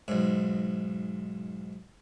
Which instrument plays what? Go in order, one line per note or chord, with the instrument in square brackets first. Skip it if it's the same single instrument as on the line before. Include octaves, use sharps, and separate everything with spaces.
[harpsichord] B1 G#2